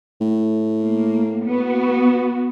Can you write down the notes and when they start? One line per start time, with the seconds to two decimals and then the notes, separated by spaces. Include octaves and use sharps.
0.21 A2
0.82 A#3
1.45 B3 F#4